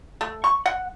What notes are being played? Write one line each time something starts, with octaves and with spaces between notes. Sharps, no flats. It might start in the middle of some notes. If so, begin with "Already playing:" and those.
A3
C#6
F#5